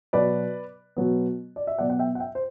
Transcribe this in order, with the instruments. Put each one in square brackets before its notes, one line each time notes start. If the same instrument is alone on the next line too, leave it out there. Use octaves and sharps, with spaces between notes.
[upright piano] B2 F#3 B3 B4 D5
B2 F#3 B3
D5
E5
B2 F#3 B3 D5 F#5
F#5
E5 G5
F#5
E5 G5
C5